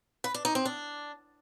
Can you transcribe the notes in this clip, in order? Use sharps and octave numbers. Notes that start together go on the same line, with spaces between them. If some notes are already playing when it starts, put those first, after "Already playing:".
B4
D4
D#4
C4
D4